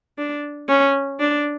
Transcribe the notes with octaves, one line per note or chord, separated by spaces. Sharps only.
D4
C#4
D4